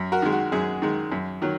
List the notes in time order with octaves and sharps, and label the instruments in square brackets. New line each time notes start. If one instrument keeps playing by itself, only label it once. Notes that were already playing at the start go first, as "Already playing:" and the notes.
Already playing: [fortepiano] F#2
F#4 A#4
D#3 G#3
F#4
F#2 G#4
D#3 G#3
F#2
D#3 F#3